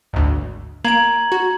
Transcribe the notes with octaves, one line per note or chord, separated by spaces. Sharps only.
G#1 D2
A#3 A#5 G#6 D7 F#7
F#4